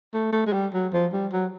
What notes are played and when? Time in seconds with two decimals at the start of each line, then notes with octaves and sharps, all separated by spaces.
0.14 A3
0.32 A3
0.46 G#3
0.53 G3
0.74 F#3
0.93 F3
1.13 G3
1.32 F#3